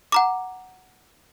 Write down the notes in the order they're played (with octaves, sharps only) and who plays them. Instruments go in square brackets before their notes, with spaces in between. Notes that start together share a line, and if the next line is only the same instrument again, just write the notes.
[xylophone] F#5 A#5 D6